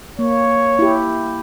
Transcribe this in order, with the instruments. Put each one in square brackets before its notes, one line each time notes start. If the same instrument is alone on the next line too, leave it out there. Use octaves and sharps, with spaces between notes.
[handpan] A#3 [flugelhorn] C#5
[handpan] E4 G4